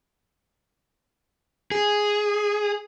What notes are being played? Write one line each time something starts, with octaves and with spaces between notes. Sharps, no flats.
G#4